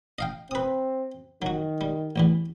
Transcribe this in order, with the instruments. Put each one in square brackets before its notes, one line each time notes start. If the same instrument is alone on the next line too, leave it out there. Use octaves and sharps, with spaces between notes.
[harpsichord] D#5 F5 G5
[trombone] C4 [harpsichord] B4 D#6
[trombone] D#3 [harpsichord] F#3 F#4
[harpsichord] G3
A1 E2 E3